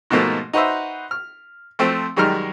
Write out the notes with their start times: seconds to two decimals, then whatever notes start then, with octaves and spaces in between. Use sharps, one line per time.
0.10 G#2 B2 F3 A3 A#3
0.53 D#4 F#4 B4 C5 E5
1.11 F6
1.79 F3 A3 C4
2.17 F#2 D#3 G3 G#3 A#5 F6